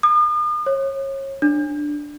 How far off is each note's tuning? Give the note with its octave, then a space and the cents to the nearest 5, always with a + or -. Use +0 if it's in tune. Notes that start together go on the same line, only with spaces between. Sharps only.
D#6 -40
C#5 -30
D4 +10